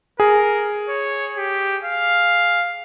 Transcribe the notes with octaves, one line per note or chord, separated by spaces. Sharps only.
G#4 A#4
C#5
G4
F5